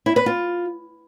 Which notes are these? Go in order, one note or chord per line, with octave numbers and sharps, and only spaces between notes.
E4
B4
F4